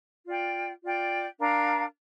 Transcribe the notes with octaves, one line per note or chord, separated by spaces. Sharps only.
F4 D5 G5
F4 D5 G5
D4 A#4 F5 A#5